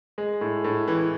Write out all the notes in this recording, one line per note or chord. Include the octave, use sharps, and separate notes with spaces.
G#3
A2
A2
E3